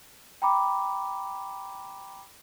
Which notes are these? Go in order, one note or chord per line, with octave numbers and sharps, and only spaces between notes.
G5 A#5 B5 D6